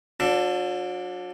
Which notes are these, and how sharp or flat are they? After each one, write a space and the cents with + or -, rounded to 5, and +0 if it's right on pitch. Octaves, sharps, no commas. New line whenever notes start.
F#3 -45 D4 +0 A4 +25